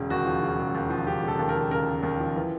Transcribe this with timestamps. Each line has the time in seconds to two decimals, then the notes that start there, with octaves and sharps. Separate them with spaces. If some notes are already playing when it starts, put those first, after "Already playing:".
Already playing: E1 C#3
0.10 D#2 F#4
0.25 F3
0.42 C#3
0.59 E1
0.74 D#2
0.90 F3
1.07 C#3 G4
1.23 E1
1.28 A4
1.39 D#2
1.49 A#4
1.55 F3
1.71 C#3 A#4
1.87 E1
2.03 D#2
2.20 F3
2.36 E3